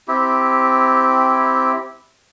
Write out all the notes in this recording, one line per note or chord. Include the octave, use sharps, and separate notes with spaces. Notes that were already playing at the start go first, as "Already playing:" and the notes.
C4 E4 G4